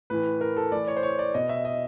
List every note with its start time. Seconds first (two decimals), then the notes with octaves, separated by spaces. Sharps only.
0.10 A2 E3 B4
0.41 A#4
0.57 A4
0.72 A2 E3 D5
0.88 C#5
0.96 C5
1.03 C#5
1.19 D5
1.34 B2 D#5
1.49 E5
1.65 D#5